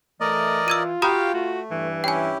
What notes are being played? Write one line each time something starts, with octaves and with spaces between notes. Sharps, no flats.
E3 A3 A#4 D5 D#5
F4 E6 G#6 D#7
F#4 G4 F5 G5 A#5 B5 D#6
A3 F#4
G2 E3
C#4 E4 G4 G5 G#5